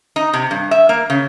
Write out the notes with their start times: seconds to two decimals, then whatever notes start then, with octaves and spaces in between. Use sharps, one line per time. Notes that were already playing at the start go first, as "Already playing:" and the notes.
0.16 D#4
0.33 C3
0.51 G2
0.71 E5
0.89 A#3
1.10 C#3